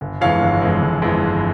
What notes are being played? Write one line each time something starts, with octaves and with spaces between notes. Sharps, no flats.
G1
F2 E3 G#3 C#5 F5
G1
F2 E3 G#3
G1
F2 E3 G#3
G1